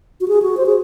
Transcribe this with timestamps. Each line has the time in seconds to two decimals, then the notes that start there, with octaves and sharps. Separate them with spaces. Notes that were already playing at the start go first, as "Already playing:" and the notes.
0.21 F#4
0.28 G#4
0.42 F#4
0.57 C5
0.66 G#4